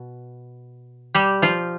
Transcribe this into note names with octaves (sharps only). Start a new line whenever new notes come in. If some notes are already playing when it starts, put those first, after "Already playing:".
Already playing: B2
G3 G4
F3 F4